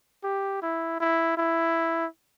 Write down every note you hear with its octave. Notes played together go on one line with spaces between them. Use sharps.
G4
E4
E4
E4